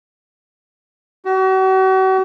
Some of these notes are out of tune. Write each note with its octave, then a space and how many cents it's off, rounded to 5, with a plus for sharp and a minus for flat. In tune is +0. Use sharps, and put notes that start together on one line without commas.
F#4 +40